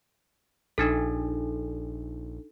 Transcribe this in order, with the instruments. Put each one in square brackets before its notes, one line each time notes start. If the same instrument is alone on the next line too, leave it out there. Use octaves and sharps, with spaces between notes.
[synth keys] A#1 [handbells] D4 D#4 A4